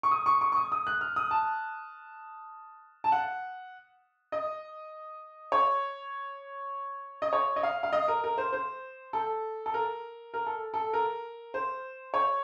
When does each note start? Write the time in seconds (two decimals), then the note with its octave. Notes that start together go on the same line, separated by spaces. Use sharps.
0.03 C#6
0.11 D#6
0.26 C#6
0.41 C#6
0.52 C#6
0.56 D#6
0.72 D#6
0.87 F#6
1.01 F6
1.16 D#6
1.31 A5
3.04 A5
3.12 F#5
4.32 D#5
5.52 C#5
7.22 D#5
7.33 C#5
7.56 D#5
7.63 F5
7.83 F5
7.93 D#5
8.08 A#4
8.24 A#4
8.38 C5
8.53 C5
9.13 A4
9.66 A4
9.74 A#4
10.34 A#4
10.46 A4
10.74 A4
10.93 A#4
11.54 C5
12.14 C#5